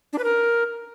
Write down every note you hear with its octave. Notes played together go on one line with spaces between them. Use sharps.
D4
B4
A#4